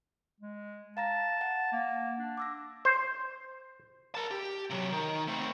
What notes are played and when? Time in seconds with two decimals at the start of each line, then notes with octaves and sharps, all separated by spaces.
0.40 G#3
0.97 F5 A5 A#5 A#6
1.41 F#5
1.72 A#3
2.19 D4
2.37 D6 E6 A#6
2.85 C5
4.15 A#4 A5
4.31 G4
4.70 C3 F#3
4.91 D#3
5.28 A3 C4